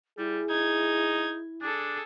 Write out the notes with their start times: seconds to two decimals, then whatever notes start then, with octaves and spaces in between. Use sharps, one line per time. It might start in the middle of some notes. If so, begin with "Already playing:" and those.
0.18 G3 E4 G#4
0.50 D#4 G#6
1.62 D4 G#4 A4